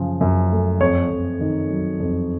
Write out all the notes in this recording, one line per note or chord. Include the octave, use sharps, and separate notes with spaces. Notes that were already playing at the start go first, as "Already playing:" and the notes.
Already playing: F#2 C#3 F3
F#2
A3
F2 C#5
F2
D#3
F#3
F2